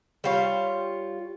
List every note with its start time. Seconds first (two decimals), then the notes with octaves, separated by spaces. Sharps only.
0.24 G3 F4 C#5